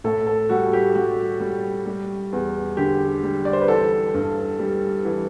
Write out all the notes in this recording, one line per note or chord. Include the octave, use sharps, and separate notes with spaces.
A2 A4
A4
G3 F#4
G4
G3 F#4
G3
G3
E2
D3 G4
G3
D5
C5
B4
E3 A4
G2
G3
E3